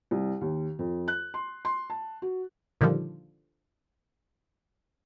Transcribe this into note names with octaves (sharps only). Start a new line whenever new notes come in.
C2
D#2
F2
F#6
C6
C6
A5
F#4
A#2 D3 D#3 F3 G3